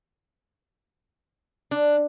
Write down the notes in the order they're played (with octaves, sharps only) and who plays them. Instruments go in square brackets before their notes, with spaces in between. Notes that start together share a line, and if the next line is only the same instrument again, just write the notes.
[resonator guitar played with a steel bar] D4